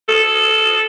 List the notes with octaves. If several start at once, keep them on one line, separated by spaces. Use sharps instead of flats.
A4